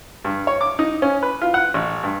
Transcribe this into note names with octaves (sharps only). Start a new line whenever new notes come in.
G2
C#5
D6
D#4
C#4
B4
F4
F#5
A1
G2